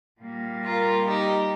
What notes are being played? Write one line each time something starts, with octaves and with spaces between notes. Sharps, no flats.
A#2 G3 A#3
F4 A#4
D#4 G4